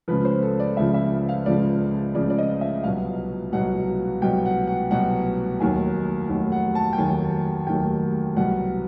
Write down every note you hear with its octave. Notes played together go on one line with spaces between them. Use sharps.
C#2 C#3 F3 B4
C5
A4
D5
C#2 C#3 F3 E5
E5
F5
C#2 C#3 F3 D5
C#2 C#3 F3 D5
D5
D#5
E5
C2 B2 F#3 F5
C2 B2 F#3 F#5
C2 B2 F#3 G5
F#5
F#5
C2 B2 F#3 F#5
F1 D#2 D#3 F#3 G#5
F1 D#2 D#3 F#3
F#5
A5
G5
F1 D#2 D#3 F#3 G#5
F1 D#2 D#3 F#3 G5
C2 B2 F#3 F#5